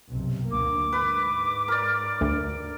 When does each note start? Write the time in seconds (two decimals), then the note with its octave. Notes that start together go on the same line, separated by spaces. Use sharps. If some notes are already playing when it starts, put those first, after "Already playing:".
0.11 F#1 B1 C3
0.51 D2 A#3 D6
0.93 G#2 B4
1.68 A#4 D5
2.21 D2